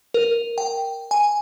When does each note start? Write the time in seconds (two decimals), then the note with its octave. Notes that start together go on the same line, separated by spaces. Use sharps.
0.14 A#4
0.58 G5
1.11 G#5